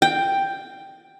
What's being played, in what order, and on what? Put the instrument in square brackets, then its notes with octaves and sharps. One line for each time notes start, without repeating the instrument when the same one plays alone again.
[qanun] G5